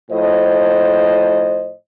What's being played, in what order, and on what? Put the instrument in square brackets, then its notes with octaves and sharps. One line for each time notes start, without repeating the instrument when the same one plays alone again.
[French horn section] A2 F3 C5 D#5